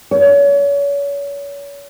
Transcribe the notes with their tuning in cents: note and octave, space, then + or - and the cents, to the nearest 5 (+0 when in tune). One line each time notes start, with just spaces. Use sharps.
C#5 +35